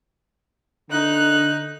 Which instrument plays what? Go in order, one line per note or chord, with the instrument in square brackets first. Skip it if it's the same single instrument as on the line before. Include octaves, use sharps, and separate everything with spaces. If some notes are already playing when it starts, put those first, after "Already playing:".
[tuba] D3 [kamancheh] D#4 F#6